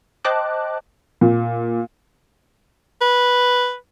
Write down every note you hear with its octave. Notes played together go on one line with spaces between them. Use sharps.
C5 D#5 G5 A5 D6 F#6
A#2
B4